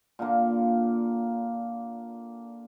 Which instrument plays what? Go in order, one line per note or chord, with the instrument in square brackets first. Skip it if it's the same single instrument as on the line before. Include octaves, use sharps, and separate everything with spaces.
[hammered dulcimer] A#2 D3 A#3